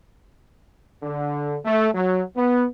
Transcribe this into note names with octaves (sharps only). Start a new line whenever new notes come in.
D3
A3
F#3
B3